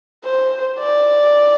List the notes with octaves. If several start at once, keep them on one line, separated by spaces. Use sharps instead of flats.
C5
D5